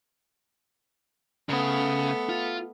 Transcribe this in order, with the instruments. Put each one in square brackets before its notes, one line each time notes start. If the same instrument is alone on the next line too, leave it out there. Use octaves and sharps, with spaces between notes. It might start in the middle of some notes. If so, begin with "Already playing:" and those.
[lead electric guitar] C#3 [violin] A3 B3
[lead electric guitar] F4